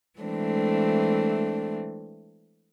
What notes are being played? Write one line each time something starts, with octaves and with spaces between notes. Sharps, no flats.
E3 G#3 A3 C4 D4